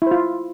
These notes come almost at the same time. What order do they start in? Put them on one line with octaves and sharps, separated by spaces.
E4 C5 F4